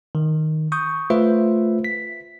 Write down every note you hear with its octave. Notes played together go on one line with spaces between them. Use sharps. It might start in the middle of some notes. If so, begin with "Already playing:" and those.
D#3
C#6 D#6 G6
A3 F4 B4 C5 E5
B6